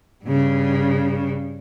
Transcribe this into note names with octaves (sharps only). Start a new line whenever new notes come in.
G2 C#3